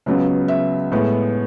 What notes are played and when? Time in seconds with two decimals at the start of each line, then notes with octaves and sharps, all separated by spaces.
0.06 C#2 C#3 F#3 B3
0.48 E5
0.92 A2 G#3 B3